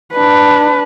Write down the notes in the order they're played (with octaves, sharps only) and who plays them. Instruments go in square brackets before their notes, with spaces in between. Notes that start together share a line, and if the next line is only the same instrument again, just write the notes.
[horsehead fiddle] D4 B4